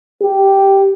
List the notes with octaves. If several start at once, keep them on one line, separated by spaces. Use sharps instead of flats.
G4